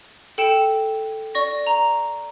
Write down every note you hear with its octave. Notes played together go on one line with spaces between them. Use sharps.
A4 G5 C#7 E7
D5 C#6 A#6
A#5